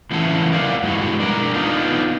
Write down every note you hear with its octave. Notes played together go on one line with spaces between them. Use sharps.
A2 C#3 E3 E4 F#5 A5
A#4 D5 F5 F#5
G2 G#3 E4 F#4
D4 A#4
B3 D4 D#4 F4